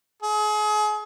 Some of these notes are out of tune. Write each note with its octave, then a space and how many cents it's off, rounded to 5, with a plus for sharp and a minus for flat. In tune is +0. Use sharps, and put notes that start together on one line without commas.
G#4 +35